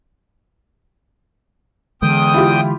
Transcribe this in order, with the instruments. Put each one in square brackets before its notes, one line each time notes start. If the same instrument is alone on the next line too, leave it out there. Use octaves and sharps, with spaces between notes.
[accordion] E2 G5 D#6 [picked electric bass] D3 E3 G#3
[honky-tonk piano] E4 F4 G4